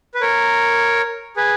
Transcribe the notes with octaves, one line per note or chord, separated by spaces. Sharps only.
B4
A#4 C#5
G#4 B4